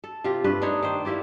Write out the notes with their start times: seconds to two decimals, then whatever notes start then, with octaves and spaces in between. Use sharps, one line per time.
0.04 A4
0.24 C3 C4 F4 G4
0.44 G2 A3 B4
0.62 D4 D#4 C5 C#5
0.83 D#3 C5 D5
1.05 A#3 E4 G4 D5